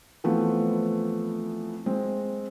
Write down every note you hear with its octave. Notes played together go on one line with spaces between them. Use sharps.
E3 F3 A3 B3 C4
G#3 C4